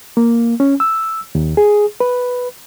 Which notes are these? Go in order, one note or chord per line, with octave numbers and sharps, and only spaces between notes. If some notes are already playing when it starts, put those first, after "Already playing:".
A#3
C#4
E6
D#2
G#4
B4